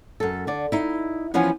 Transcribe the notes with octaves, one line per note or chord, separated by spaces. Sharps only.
F#2 A4
D3 D5
D#4 E4
E3 F3 B3 C#4 F#5 G#5